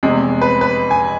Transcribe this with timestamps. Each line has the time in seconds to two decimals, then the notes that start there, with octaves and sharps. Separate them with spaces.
0.03 F1 E2 C3 G#3
0.41 B4
0.61 B4
0.91 G#5